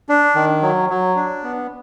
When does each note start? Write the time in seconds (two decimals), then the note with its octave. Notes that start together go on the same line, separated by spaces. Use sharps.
0.09 D4
0.35 D#3
0.62 F#3
0.90 F#3
1.16 D4
1.44 B3